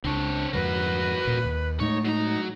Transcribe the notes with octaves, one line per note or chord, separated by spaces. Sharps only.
C#2 C4 D4 C#5
F2 G#2 D3 F#4 A#4 B4
E1 A#2
D#2
A2 G#3 A3 D#4 C#5
F#3 D#4 A#5